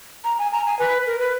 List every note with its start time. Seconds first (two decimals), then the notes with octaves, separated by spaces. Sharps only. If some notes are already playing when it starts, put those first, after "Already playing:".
0.24 A#5
0.39 G#5
0.52 A#5
0.67 G#5
0.79 B4
1.07 A#4
1.19 B4